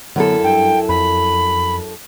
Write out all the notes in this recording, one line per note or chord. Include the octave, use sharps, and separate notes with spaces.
F#2 D3 F#3 B3 E4 A4
G2 G5
F2 B5